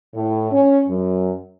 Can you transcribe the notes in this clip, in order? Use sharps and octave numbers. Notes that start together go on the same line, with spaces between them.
A2
C#4
F#2